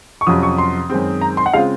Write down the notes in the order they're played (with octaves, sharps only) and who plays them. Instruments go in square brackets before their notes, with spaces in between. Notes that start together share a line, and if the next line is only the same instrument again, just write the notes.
[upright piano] C#6
[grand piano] F2 C3 F#3 C#4 F4 [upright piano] D#6
[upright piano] C#6
C6
[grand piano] F#2 D#3 G#3 C4
[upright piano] A#5
C6
F#5
[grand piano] C#3 G#3 C4 F4 [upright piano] F5